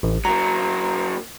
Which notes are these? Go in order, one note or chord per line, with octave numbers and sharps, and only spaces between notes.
A1
F#3 A#3 A#5